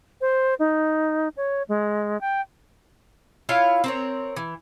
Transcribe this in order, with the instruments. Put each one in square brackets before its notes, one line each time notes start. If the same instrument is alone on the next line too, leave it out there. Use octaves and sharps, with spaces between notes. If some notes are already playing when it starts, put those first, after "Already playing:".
[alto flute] C5
D#4
C#5
G#3
G5
[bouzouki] E4 F4 C#5 F5
C4 A#4 C#5
E3